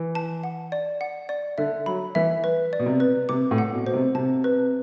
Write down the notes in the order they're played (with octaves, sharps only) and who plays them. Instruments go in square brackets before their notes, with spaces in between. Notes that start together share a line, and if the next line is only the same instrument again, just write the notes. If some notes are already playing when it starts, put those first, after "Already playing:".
Already playing: [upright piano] E3
[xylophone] A5
F#5
D5
F#5
D5
[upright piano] D3 [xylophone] E5
[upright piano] F#3 [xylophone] B5
[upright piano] E3 [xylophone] E5
[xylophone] B4
D5
[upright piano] B2
C3
[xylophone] B4
[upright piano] C3 [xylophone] D6
[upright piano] A2
[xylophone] F#5
[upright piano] B2
[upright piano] B2 [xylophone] C5
[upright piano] C3
[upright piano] C3 [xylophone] A5
[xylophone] B4